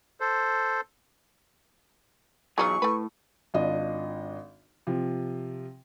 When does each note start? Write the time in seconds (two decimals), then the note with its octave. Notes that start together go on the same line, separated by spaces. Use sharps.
0.20 A4 C5
2.58 B1 E3 F#3 D#4 F4 G#4 C#6
2.82 A2 A3 B4
3.54 G#1 D4 F4 D#5
4.87 C3 F3